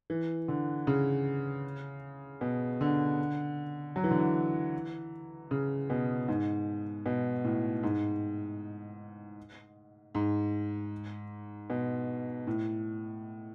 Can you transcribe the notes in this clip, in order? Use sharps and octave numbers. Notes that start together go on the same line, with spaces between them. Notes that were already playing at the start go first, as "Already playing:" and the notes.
E3
D3
C#3
B2
D3
F#3
E3
D3
E3
C#3
B2
G#2
B2
A2
G#2
G#2
B2
A2